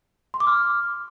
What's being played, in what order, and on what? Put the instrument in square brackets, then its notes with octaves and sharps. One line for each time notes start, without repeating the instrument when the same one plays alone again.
[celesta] C6
D6
F6